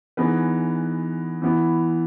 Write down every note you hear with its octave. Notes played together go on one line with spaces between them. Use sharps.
E3 B3 D#4 G#4 B4
E3 B3 E4